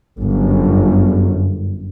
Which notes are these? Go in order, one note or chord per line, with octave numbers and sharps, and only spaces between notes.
G1 F#2